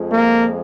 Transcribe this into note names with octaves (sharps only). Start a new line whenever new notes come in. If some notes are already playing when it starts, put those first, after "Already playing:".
Already playing: F2 F3 G#3
A#3